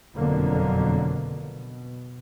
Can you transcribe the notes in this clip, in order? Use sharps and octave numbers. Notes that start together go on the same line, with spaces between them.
F#1 F2 B2 D3 F#3 A#3
B2